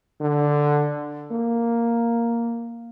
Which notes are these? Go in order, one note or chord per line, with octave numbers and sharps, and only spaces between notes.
D3
A#3